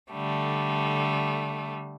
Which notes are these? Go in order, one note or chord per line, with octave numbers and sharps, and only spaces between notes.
D3 G3 A3